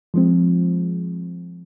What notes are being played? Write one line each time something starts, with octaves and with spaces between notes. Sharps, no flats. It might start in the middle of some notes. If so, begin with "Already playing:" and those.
F3 G#3 C4